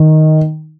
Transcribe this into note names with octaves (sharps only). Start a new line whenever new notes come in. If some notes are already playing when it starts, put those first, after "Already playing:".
Already playing: D#3